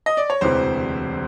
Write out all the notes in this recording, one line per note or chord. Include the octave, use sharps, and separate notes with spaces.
D#5
D5
C#5
E1 D2 C3 E3 C5